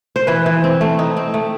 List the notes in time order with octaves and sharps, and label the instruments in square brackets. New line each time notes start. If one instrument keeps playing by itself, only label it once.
[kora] C5
E3 B4
E3
C4
A3
D#4
C4
A3